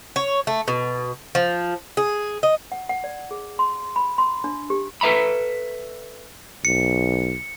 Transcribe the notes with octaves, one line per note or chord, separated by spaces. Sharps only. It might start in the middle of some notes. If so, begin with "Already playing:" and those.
C#5
A3
B2
F3
G#4
D#5
F#5
F#5
D5
G#4
C6
B5
C6
D4
G4
A4 B4 E5 A#5 B5
B1 C#7